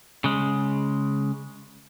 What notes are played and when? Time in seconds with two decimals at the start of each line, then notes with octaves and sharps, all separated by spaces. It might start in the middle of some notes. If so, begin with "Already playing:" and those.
0.24 C#3 G#3